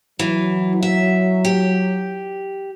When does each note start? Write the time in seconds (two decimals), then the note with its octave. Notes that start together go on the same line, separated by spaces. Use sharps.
0.19 E3 F#3
0.83 E5
1.45 G4